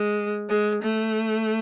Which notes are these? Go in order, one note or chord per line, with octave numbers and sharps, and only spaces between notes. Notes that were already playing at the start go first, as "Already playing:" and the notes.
Already playing: G#3
G#3
A3